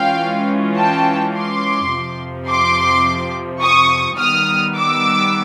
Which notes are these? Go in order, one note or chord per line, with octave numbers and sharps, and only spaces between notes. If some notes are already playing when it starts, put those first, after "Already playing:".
Already playing: E3 G#3 C#4 F4 F5 G5
G5 A5
C6 D6
F2 C3 F3
C6 D6
C#6 D#6
D#3 G3 B3 D#6 F6
D6 E6